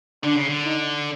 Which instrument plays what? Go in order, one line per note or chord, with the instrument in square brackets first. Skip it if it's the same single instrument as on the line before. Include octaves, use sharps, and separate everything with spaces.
[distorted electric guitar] D3 [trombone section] D4
[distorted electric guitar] C#3
D3
[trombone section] D#4